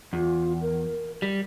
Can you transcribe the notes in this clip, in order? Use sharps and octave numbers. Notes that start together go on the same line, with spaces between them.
E2 F4
A#4
G3